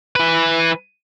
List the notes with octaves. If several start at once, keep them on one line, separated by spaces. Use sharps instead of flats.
E3 B4